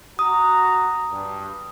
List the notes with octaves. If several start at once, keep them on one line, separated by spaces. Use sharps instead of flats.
F#4 A#5 D#6
G2